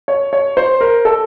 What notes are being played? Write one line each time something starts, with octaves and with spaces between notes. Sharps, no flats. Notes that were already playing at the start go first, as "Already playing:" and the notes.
C#5
C#5
C5
A#4
A4